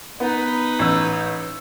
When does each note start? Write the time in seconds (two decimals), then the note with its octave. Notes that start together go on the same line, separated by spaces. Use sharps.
0.20 B3 D#4 B4
0.79 A1 E6